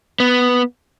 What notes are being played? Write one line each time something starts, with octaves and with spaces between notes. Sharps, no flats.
B3